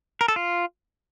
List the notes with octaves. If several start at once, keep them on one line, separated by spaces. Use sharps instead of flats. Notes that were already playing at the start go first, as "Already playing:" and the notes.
A#4
A4
F4